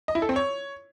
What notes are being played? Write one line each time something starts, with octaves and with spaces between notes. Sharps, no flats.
D#5
E4
A4
C4
C#5